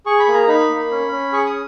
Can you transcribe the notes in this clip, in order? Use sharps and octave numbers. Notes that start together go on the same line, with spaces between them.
G#4 C#6
B5
A#3
A#5
D#4 B5
A#3
C#4
C#4
G#4 C#6
D#6